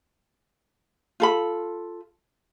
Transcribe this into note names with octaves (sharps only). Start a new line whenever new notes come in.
F4 A4 B5